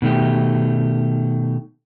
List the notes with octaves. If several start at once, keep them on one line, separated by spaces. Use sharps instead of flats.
B2 D#3 A3 G4